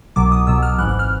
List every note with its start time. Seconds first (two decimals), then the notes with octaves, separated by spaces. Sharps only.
0.16 C2 B2 F#3 D6
0.32 D#6
0.47 C2 B2 F#3 E6
0.63 F6
0.79 G#1 G#2 E3 F#6
0.89 F#6
0.99 F6